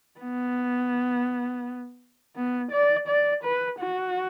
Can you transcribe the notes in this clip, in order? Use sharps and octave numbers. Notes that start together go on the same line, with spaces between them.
B3
B3
D5
D5
B4
F#4